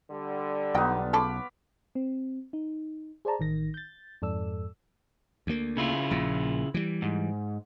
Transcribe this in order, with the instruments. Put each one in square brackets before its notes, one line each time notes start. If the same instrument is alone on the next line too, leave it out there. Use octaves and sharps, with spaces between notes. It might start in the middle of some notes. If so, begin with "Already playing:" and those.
[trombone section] D3 G3
[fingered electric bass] B1 [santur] B3 D#4 F4 [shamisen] D#5 G5
[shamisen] C#3 F4 A4 [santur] C#5 B5 D6
[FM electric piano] C4
D#4
G#4 C5 D5 A5 A#5
A1 D#3 A#6
G6 A6
F2 G#2 A4 D5 E6
[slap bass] D2 A#3
[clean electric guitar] C#3 E4 F4
[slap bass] A#1 A#2
E3 G3
[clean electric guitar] G#2